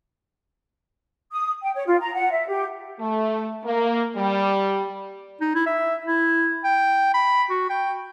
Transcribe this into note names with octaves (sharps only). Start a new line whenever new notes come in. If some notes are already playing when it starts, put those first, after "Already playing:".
D#6
G5
C#5
F4
A#5
F#5
E5
G4
A3
A#3
G3
D#4
E4
E5
E4
G5
B5
F#4
G5